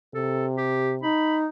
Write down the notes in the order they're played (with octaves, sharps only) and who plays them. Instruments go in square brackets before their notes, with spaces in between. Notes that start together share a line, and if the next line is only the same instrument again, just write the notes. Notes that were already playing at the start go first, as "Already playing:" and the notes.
[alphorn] C3 [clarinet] A4
[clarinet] G4
[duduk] D#4 [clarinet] B5